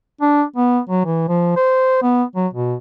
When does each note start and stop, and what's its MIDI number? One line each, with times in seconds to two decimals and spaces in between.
0.21 0.43 62
0.56 0.79 59
0.89 1.05 54
1.05 1.28 52
1.28 1.53 53
1.56 2.02 72
2.02 2.23 59
2.35 2.47 54
2.54 2.75 47